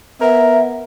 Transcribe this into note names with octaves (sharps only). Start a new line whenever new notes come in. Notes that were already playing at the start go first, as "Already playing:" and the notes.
B3 A#4 E5